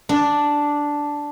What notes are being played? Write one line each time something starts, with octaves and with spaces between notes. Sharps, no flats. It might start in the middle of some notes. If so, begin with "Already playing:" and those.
D4